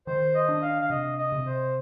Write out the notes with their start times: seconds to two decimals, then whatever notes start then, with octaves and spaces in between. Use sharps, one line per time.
0.07 D#3 C5
0.35 D#5
0.49 D4
0.62 F5
0.82 F5
0.90 C3 D#5
1.18 D#5
1.32 C3
1.46 C5